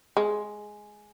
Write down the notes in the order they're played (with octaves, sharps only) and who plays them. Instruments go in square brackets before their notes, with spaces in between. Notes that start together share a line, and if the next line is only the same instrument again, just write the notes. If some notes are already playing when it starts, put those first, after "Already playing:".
[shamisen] G#3